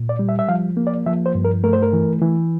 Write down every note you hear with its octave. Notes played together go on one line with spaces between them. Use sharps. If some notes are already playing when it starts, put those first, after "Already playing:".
Already playing: A#2
D5
G3
E5
E5
F3 F5
A#3
D5
F3 E5
C5
G2
A#4
A3 A#4
C5
A#4
E3
E3